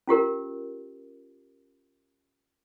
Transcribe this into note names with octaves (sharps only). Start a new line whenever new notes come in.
C#4 F4 G4 A#4